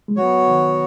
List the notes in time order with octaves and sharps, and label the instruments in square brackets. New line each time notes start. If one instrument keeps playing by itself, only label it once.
[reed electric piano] G#3
[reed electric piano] F#3 [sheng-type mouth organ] B3 F#4 C#5
[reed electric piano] D#3